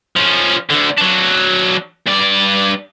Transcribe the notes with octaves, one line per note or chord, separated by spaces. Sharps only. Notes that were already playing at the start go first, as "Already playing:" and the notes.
F3 C#4
D2 D3
F#3 D4
G2 D5